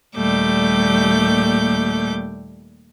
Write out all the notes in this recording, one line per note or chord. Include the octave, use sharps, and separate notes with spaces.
D#2 A#2 G3 A3 D6 G6